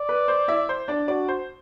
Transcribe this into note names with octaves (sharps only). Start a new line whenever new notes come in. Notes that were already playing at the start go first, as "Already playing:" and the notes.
Already playing: D5
B4
C5
E4 E5
C5
D4 D5
D4 F#4 D5
C5